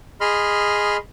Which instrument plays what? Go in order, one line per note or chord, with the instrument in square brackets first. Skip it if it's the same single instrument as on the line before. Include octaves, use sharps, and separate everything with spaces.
[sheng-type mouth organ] G#4 D#5 B5 C6 F6